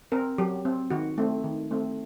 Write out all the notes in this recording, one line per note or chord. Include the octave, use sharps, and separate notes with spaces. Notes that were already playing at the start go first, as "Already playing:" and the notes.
C4 A#4
F#3 G4
C4
D#3 F#4
A3 C4
D#3
A3 C4